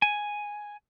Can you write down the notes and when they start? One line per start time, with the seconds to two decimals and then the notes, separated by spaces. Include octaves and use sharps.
0.02 G#5